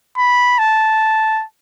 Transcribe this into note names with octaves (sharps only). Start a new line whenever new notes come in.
B5
A5